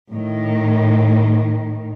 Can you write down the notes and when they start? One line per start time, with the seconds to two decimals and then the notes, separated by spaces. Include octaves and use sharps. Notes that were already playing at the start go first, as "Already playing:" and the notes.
0.10 A2 D#3